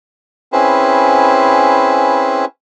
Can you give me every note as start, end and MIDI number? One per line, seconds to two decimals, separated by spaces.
0.53 2.45 60
0.53 2.45 61
0.53 2.45 64
0.53 2.45 68
0.53 2.45 71
0.53 2.45 72